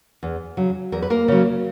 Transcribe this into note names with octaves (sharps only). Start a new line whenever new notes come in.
E2
C#3 F#3
E2 A#4
B4
A#3 A#4
C#3 F#3